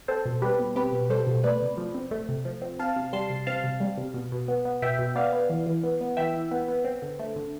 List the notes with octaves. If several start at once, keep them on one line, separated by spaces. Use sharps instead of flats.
C4 A4 C5
B2
G3 G4 B4
B2
C4 G4 B4
B2
G3 A4 C5
B2
A3 B4 D5
C3
F3
C4
A3
C3
F3
C4
C4 F5 A5
C3
G3 A5 C6
C3
C4 F5 A5
C3
G3
C3
B2
B2
B3
B3
B2 E5 G5
B2
B3 D5 F5
B3
E3
E3
B3
B3
E3 E5 G5
E3
B3
B3
C4
D3
A3
D3